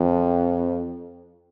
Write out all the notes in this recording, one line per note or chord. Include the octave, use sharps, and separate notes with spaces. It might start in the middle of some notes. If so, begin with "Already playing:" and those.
Already playing: F2